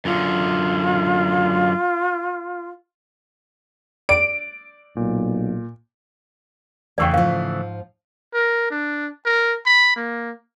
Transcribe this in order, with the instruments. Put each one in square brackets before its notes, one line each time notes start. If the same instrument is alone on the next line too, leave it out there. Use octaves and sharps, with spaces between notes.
[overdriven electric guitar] F#2 D3 [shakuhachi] F4
[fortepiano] D5 [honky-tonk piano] D7
[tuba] B1 [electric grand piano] A#2
[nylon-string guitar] E2 F5 G5 [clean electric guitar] C#3 E3 A3 [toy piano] D5 C#6
[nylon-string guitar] G#2 F3 [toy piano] F5
[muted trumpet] A#4
D4
A#4
B5
A#3